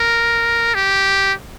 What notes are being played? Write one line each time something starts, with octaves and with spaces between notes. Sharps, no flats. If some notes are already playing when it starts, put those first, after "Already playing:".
Already playing: A#4
G4